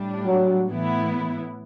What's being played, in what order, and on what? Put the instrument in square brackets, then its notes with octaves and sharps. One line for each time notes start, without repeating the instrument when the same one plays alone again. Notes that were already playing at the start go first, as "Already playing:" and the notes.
Already playing: [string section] A2 G3 D4
[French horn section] F#3
[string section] A2 E3 B3 E4